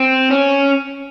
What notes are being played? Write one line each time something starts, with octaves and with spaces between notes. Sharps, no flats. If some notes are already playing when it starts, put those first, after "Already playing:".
Already playing: C4
C#4